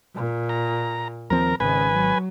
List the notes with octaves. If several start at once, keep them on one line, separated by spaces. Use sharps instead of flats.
A#2
A#5
D#2 F3 C4 A#4 A#5
G#1 C#3 B4 G#5
F#3